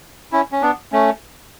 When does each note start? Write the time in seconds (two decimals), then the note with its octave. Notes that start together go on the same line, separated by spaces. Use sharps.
0.32 C#4 E4
0.52 C#4
0.62 B3 D4
0.92 A3 C#4